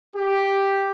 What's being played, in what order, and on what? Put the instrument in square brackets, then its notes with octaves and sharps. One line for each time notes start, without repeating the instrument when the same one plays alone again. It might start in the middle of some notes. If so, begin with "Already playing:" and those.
[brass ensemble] G4